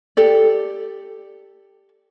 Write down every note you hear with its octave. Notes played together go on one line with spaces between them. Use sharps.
G4 A4 D5